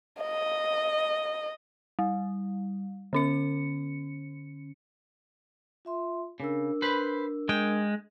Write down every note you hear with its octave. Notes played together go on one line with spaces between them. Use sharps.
D#5
G3
D3 C#4 C#7
F4 E5 C6
C#3 D4 A#4 E6
B4 C5 B5
G#3 G5